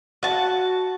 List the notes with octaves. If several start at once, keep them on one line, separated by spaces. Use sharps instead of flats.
F#4 A5